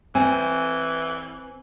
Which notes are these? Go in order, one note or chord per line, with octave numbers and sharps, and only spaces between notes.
E3 C4 G#5